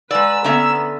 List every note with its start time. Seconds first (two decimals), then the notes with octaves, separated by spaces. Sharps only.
0.11 G#3 B4 D5 F#5 G#5 A#5 E6
0.44 D3 B3 C#4 E5 A#5